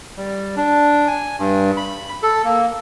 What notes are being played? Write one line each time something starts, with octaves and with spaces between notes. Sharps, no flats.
G3
D4
G#5
G2
B5
A4
A#3